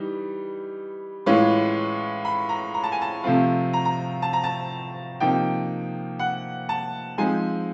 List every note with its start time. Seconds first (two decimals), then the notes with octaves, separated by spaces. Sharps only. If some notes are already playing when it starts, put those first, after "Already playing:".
Already playing: E3 G3 D#4
1.26 A2 E3 G#3 C#4 F4
2.25 B5
2.49 A#5
2.74 A#5
2.84 A5
2.92 G#5
3.02 A5
3.24 C3 F3 A3 C4 F4
3.73 A#5
3.85 A#5
4.22 A5
4.33 A#5
4.44 A5
5.20 C3 F3 A#3 D#4 G5
6.19 F#5
6.69 A5
7.18 F3 G#3 C4 D#4 G#5